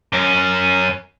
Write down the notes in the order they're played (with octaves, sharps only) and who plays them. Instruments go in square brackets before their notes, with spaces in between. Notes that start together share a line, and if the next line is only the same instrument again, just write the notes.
[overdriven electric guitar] F#2 C#4